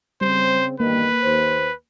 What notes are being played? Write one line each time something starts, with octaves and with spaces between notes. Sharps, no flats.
C#3 G3 C4 C5
E2 G2 D#3 A#3 B4
D#2 C5